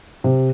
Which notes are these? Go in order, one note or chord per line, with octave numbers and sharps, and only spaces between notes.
C3